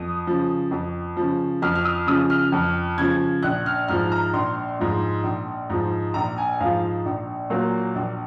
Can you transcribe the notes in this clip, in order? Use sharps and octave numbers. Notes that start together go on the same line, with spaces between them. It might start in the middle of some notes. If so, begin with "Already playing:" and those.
Already playing: F2 D#6
C#3 F3
F2
C#3 F3
F2 F6
F6
D#6
C#3 F3 D#6
F6
F2
C#3 F3 G#6
A#1 F#6
F6
G#2 F3 F6
A#5
A#1 C6
G#2 F3
A#1
G#2 F3
A#1 A#5
G#5
G#2 F3 F5
A#1
A#2 F#3 A#3
A#1